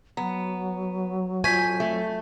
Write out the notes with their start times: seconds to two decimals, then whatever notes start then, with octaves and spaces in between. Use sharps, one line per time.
0.17 F#3 B3 A#5
1.44 F2 G#5 C#6 G6 B6
1.80 A3